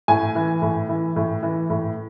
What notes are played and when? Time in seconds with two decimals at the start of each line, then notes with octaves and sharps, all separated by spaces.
0.08 A2 G#5
0.35 E3
0.62 A2
0.89 E3
1.16 A2
1.43 E3
1.70 A2